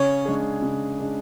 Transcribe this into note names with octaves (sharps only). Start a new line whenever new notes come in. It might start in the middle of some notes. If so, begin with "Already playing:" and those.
Already playing: C#3 C#4
G#3 D4 G#4
C#3
G#3 D4 G#4